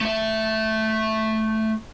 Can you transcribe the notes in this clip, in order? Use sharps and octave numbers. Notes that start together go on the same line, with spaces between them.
A3 E5